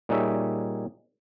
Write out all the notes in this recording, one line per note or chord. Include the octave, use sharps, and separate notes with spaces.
A#2 G3 D#4 G#4 C#5 E5